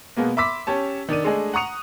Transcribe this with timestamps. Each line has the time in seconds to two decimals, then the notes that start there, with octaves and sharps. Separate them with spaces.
0.17 B2 G#3 A#3 B3
0.37 E5 B5 C6 D6 E6 B6
0.67 C#4 G4 C#5 A5
1.09 D#3 D4 D5 D#7
1.24 G#3 A3 D4 G#4 D#5
1.54 F#5 A#5 C#6 D#6 C#7 F7